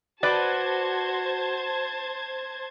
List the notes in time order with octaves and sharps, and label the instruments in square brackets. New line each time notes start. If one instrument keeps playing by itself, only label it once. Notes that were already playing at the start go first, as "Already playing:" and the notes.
[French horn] F#4 [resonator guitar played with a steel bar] B4 D5 [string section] C5 A5 G#6